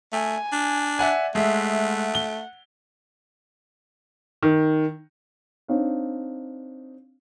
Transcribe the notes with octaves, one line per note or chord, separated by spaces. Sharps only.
A3 G#5
D4
D5 E5 F#5 G#5
G#3 A3 E5 F#5
G7
D#3
C4 D4 D#4 C#5 F5